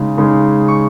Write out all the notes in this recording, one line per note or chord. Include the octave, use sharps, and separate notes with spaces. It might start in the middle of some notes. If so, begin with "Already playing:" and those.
Already playing: C#3 G#3 D#4
C#3 G#3 D#4
C#6